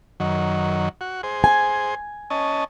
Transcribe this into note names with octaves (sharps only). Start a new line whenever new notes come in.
F#2 D#3 F#3
F#4
G#4 C5
G#5
C#4 D#5 A5